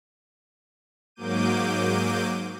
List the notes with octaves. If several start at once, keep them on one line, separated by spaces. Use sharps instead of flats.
G#2 F#3 A#3 D6 G6 D#7